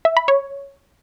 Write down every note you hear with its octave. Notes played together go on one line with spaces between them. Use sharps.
E5
B5
C#5